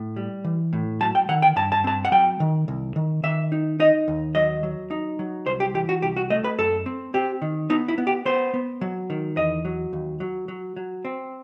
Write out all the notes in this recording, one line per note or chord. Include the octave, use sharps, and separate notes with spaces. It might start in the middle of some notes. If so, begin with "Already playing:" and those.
Already playing: A2
G3
E3
A2
F#3 A5
G5
D#3 F#5
G5
G2 A5
A5
C4 A5
F#5
F#3 G5
D#3
C2
D#3
D#3 E5
D#4
D#4 D#5
D#2
F#3 D#5
F#3
D#4
F#3
C2 C5
G4
E3 G4
F#4
C2 G4
F#4
A3 D#5
B4
F#2 A4
C4
C4 G4
D#3
B3 D#4
E4
B3
G4
B3 C5
B3
F#3
D#3
E2 D#5
F#3
D#2
F#3
F#3
F#3
C4